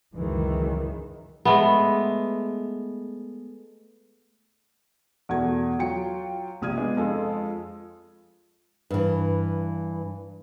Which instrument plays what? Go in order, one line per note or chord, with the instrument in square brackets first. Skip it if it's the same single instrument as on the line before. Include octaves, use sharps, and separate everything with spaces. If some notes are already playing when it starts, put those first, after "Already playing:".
[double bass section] C#2 F#2 D#3 E3 G#3
[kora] G#3 A3 B3
[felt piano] E2 B2 A3 G#6
F#3 F4 G5 C#7
A#1 C3 D#6 F6 G#6 D#7
G#3 B3 D4
F2 G#3 F4 A4
[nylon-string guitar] G2 E3